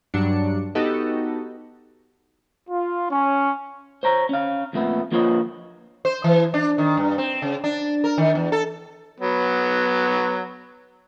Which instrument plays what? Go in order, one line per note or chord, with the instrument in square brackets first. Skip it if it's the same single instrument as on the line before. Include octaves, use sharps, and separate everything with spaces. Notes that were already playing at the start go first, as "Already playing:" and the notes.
[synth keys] G2 F#3 D4 C#7
B3 D#4 F#4 G4 A4 D#5
[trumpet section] F4
C#4
[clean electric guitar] C5 C#5 A#5
C#4 F5
F2 A#2 A3 B3
F3 A#3 F4 B4 C#5 D#5
[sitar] C5
E3
D4
D#3
G2
C4
C#3
D4
A#4
D#3
E2
A4
[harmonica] F#3 B3